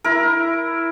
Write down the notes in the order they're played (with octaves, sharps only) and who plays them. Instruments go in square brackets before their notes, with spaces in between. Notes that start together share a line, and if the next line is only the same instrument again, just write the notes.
[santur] E4 A#4